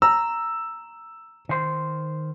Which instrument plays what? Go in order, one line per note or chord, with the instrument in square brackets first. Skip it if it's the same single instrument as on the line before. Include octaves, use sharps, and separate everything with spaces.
[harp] A#5 [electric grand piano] E6
[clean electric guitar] D#3 C5